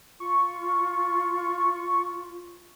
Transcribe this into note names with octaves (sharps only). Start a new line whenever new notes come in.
F4 C#6